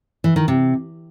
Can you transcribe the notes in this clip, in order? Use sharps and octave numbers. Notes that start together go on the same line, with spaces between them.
E3
D#3
C3